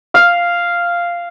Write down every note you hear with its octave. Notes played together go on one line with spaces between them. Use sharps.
F5